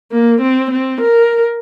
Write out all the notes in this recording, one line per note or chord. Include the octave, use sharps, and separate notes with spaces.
A#3
C4
C4
A#4